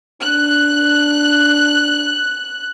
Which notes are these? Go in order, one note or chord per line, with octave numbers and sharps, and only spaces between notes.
D4 F#6